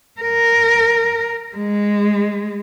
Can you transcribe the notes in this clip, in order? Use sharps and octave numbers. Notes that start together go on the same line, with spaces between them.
A#4
G#3